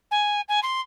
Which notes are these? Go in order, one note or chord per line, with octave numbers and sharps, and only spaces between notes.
G#5
G#5
C6